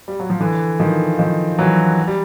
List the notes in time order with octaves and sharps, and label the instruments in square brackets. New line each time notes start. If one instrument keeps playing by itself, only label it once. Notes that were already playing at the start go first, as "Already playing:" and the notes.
[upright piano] G3
F#3
F3
D3 E3
D#3 F3
D#3 F3
E3 F#3
G3